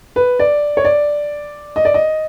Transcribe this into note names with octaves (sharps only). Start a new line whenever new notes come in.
B4
D5
C#5
D5
D#5
D5
D#5